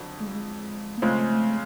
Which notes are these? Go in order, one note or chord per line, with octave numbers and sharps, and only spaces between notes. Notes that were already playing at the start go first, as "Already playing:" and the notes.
Already playing: F2 D3 F#3
G#3
G3
G#3
A#3
C#3 F3 G#3 A3 C4
A3